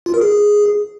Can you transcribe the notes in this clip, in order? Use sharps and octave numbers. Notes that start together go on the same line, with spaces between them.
F4
A#4
G#4